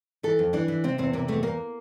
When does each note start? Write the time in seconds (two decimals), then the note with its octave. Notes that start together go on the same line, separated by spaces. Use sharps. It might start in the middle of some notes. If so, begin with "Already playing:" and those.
0.23 E3 A4
0.39 F2
0.53 E3 D4
0.68 E3
0.84 C3 C4
0.98 E2 C4
1.13 C3 A#3
1.28 E2 A3
1.43 E2 A#3